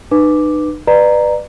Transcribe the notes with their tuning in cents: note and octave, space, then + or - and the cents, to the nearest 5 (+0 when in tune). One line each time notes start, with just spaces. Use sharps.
D#4 -40 B4 +0 D6 +0
B4 +0 D5 +30 A#5 +0